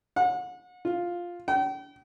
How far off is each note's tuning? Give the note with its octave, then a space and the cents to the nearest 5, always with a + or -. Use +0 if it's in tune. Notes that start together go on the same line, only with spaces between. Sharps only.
F#5 -35
F4 +5
G5 -40